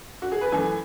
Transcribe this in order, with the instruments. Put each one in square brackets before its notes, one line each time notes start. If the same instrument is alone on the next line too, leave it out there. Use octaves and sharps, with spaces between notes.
[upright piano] F#4
G#4
B4
F#2 E3 A3 G#5